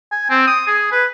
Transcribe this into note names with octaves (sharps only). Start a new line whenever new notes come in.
G#5
C4
D#6
G#4
B4